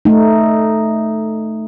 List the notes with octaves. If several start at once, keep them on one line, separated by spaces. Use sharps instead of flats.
A3 D#4